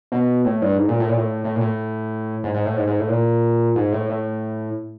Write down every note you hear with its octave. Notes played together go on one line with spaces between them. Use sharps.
B2
A2
G2
G#2
A#2
A2
A#2
A2
A2
A#2
A2
G#2
G#2
A2
G#2
G#2
A2
A#2
G#2
A2
A2